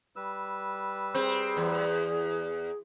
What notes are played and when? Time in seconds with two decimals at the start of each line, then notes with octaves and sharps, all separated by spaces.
0.16 G3 B4 E6
1.15 C4 G#4
1.57 E2